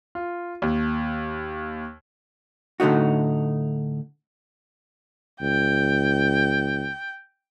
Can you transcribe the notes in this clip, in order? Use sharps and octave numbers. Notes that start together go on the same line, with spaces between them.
F4
D#2
A2 D3 A3 D#4 F#4
C#2 G5